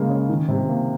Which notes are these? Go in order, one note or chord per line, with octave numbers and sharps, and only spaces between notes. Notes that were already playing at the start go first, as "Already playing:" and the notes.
Already playing: C#3 G#3 A#3
C#4
D#3
C3
A#3